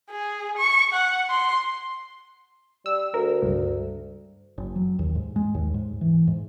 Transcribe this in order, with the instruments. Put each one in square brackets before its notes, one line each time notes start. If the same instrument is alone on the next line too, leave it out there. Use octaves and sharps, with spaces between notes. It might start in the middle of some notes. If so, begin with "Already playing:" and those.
[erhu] G#4
C#6
F#5
C6
[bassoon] G3 [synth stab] E6
[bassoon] D2 [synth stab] A#4
[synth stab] C#2 G2
[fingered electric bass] F#1
F#3
D#2
G#2
G#3
D#2
G#2
E3
G#2